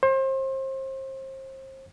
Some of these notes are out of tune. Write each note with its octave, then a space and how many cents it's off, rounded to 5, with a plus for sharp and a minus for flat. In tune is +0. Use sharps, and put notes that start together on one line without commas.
C5 +30